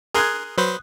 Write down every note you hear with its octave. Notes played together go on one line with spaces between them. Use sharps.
G#4 A#4 C6 D#6 F#6 G#6
F#3 B4 C5